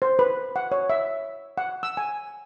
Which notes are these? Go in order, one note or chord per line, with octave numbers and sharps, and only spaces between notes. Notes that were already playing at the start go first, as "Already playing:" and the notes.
C5
B4
F#5
C#5
E5
F#5
E6
G#5